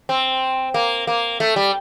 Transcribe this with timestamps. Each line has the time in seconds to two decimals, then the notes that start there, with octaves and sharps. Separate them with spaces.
0.09 C4
0.74 A#3
1.07 A#3
1.40 A3
1.56 G3